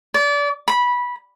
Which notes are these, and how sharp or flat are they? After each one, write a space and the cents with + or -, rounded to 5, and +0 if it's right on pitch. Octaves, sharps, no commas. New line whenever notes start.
D5 -30
B5 -15